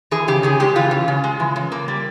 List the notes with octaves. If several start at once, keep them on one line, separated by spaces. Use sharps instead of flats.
E3 G#4
C#3 G4
C#3 G#4
G#3 G4
E3 F4
C#3
C#3
G#3
E3
C#3
A#3
G3